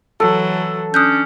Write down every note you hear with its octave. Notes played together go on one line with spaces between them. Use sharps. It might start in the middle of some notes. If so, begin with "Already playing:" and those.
E3 F#3 A4
C#4 D4 D#6 F#6 G6